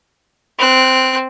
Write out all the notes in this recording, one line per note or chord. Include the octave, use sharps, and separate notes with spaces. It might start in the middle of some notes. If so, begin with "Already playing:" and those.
C4 F#6